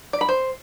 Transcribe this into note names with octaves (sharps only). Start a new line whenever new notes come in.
D5
B5
C5